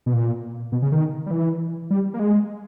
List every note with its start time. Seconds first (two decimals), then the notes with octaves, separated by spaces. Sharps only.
0.06 B2
0.13 A#2
0.72 B2
0.82 C#3
0.92 D#3
1.26 G3
1.31 E3
1.90 G3
2.14 A#3
2.19 G#3